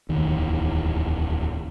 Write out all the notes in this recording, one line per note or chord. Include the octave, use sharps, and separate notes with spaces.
D1 E2 D#3